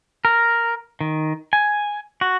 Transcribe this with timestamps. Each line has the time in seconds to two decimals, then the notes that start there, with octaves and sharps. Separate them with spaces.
0.25 A#4
1.01 D#3
1.53 G#5
2.21 F#4